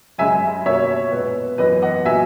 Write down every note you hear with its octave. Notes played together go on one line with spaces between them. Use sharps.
F#2 C#3 G#3 E5 G#5
B2 A#3 C#5 E5
A#2 G#3 B3
F#2 E3 B3 B4 D#5
D#5 F#5
A#2 F#3 A#3 E5 G#5